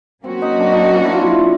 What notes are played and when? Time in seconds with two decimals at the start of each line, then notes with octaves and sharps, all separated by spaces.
0.24 F#3 A#3 C4 C#4 F#4
0.42 D#4
0.59 D4
0.72 D#4
0.83 D#4
0.95 D4
1.04 E4
1.12 F4
1.21 E4
1.30 F4